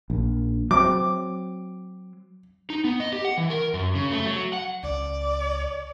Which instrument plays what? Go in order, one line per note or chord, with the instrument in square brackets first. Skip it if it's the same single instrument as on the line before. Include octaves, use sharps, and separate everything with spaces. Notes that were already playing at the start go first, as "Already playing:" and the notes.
[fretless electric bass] A#1
[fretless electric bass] F#3 C4 [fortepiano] D6
[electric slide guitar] D#4
B3
D#5
G4
F#5
E3
A#4
F#2
C#3
A3
F#3
F#5
[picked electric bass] C#2 [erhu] D5